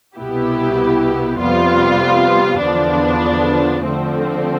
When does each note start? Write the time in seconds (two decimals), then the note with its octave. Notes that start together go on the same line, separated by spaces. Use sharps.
0.17 C2 B2 B3 E4 G4
1.39 F2 C3 G3 B3 F4
2.61 E2 D3 F3 B3 D4
3.84 D3 F3 A3 C4